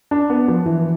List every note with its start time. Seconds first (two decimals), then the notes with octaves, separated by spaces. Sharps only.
0.11 D4
0.30 B3
0.48 F3
0.66 E3